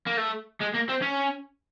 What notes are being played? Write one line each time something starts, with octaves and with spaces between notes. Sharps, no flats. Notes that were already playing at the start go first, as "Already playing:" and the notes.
A#3
A3
G#3
A#3
C4
C#4